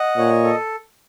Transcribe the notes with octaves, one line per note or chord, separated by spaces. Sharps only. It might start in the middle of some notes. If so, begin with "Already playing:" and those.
Already playing: D#5 F#5
A#2 C#5
A4